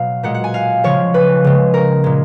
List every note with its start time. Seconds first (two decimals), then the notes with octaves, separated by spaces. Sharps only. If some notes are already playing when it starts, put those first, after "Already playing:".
Already playing: B2 F#3 F5
0.23 A#2 G#3 F#5
0.34 F#5
0.44 G#5
0.54 F5
0.84 C#3 F3 G#3 C#5
1.14 B4
1.44 C#3 G#3
1.74 A#4
2.04 A#2 G#3